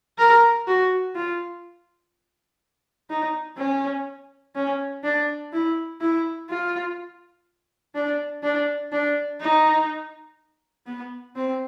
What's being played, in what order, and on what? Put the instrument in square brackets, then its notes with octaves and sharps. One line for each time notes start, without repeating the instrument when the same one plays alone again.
[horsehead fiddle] A#4
F#4
F4
D#4
C#4
C#4
D4
E4
E4
F4
D4
D4
D4
D#4
B3
C4